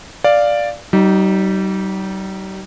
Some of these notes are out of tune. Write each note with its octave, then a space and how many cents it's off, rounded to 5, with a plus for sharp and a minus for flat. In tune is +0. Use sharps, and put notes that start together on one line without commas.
D5 +0 F5 +0
G3 -40 D#4 +0